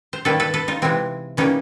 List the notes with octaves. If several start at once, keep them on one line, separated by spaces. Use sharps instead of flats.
C5
D#3 G3 A#3 A4 B4
A4 B4
A4 B4
D#4 F4
C3 E3 G#3 C4
E3 G3 A#3 C#4 D#4